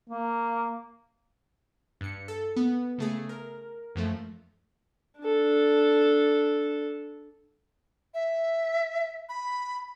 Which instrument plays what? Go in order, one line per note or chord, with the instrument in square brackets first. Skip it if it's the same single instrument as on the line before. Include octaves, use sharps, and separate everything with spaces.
[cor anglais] A#3
[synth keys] G2 C#7
A4
B3
C#3 A3 G#4
A#4
F#2 F3 A3
[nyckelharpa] D4 A4
[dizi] E5
B5